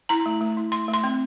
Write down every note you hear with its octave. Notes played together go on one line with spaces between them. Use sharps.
E4 A#5
A3
A3
E4
A3 C6
A3
C6
C4